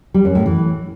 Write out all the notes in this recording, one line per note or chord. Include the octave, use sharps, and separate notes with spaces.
G3
F#2
A2
E3